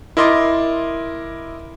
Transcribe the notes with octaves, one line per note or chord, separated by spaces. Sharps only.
E4 A#4 D#5 C6 D6 A6